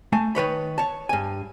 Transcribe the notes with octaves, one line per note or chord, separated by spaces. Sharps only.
A3 G#5 A5
D#3 B4 C#5 B5
C#5 A5
G2 G#5